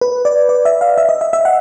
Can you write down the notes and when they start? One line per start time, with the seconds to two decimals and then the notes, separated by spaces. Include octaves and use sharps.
0.01 B4
0.25 D5
0.49 D5
0.65 E5
0.81 F5
0.98 E5
1.09 D#5
1.21 E5
1.33 E5
1.45 F#5